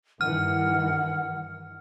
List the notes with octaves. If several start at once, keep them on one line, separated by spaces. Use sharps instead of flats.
G2 D#3 E3 F#5 F6